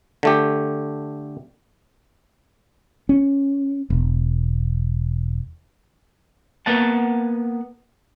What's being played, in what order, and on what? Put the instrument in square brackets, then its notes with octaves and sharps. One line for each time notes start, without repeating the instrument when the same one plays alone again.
[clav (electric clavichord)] D3 A3 G4
[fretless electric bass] C#4
E1
[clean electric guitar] A#3 B3 F#5 A5